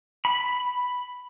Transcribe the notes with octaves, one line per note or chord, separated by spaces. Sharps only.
B5